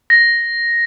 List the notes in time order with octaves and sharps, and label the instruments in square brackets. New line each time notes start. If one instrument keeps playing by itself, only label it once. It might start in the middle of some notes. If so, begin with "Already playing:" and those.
[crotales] A#6